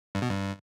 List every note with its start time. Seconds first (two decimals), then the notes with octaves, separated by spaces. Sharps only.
0.15 G2
0.22 B2
0.29 G2